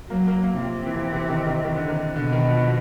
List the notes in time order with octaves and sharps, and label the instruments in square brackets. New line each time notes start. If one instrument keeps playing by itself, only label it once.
[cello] F#3 [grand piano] A#3
[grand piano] A#3
A#3
[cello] C3 [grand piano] F3
[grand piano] E3
E3
D#3
D#3
D#3
D3
D#3
[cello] B2 [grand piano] D3
[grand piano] D#3
F3